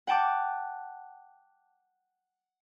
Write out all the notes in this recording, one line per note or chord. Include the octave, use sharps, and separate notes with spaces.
F#5 G5 A5 D6